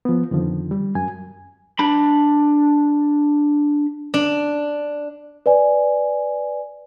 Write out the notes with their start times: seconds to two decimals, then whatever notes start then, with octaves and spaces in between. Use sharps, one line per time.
0.05 F3 B3
0.31 F2 D3 D#3 F3
0.71 G3
0.95 F#2 G#5
1.79 D4 B5
4.14 D4
5.46 B4 D5 G#5